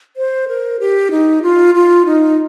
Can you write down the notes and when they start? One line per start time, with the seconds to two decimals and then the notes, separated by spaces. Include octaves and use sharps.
0.17 C5
0.48 A#4
0.80 G4
1.11 D#4
1.42 F4
1.75 F4
2.06 D#4